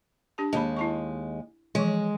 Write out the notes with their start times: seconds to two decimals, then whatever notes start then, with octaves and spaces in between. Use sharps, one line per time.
0.38 D4 G4 A5
0.53 D#2 G#3 A5 B5
0.76 E4 A5 C#6
1.75 E3 F3 G#3